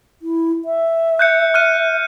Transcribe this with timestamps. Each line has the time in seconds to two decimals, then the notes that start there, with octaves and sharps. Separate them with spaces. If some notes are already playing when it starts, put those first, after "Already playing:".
0.22 E4
0.65 E5
1.19 F#6 G6 C#7
1.54 F6 F#6 D#7